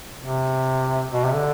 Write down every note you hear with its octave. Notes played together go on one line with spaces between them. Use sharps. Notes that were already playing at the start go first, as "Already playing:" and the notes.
C3
B2
C3
D3